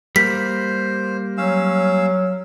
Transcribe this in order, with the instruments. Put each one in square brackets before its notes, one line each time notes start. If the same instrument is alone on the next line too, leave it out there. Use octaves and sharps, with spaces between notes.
[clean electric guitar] G3 A#3 [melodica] C5 [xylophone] B6
[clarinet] F#3 [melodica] C#4 F5 E6